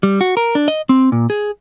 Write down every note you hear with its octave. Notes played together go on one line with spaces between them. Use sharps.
G3
F#4
A#4
D4
D#5
C4
A#2
G#4